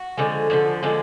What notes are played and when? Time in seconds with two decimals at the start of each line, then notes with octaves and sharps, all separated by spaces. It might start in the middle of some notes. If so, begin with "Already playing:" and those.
Already playing: F#4
0.18 D3 F3 G#3
0.50 D3 F3 G#3
0.83 D3 F3 G#3